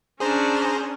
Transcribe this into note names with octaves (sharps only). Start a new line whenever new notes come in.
C#4 D4 G#4 C5 A#5